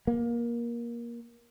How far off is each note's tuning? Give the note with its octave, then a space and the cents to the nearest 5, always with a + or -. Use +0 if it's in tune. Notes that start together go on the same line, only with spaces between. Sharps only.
A#3 +20